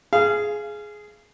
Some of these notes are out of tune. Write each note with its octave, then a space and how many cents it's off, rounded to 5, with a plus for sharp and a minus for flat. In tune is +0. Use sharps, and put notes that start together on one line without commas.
G#4 +10 F5 -25